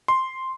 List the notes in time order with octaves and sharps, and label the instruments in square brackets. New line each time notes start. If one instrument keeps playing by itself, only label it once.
[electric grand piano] C6